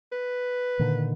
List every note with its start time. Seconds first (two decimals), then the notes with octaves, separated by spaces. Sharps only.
0.12 B4
0.79 A#2 D3 D#3